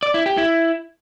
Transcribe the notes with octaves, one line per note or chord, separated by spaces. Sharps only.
D5
E4
G4
E4